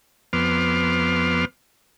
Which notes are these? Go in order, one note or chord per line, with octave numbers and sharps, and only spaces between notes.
F2 B3 C6 D6 F6